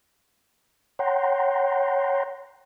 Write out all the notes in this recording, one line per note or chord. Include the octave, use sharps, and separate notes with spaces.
C#5 F#5 G5 A#5 C6